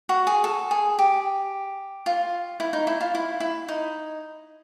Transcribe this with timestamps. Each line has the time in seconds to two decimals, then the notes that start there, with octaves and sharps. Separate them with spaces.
0.09 F#4
0.27 G#4
0.44 A4
0.71 G#4
0.99 G4
2.06 F4
2.60 E4
2.73 D#4
2.87 E4
3.01 F4
3.15 E4
3.40 E4
3.68 D#4